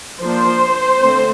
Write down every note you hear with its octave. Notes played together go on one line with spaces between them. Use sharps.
F3 A#3 D4 C5
D3 A3 C4